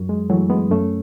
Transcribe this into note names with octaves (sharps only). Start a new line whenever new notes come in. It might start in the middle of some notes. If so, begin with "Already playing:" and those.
Already playing: F#2 F#3
G#3
E3 F#3 A3
G#3 B3
F#2 A3 C#4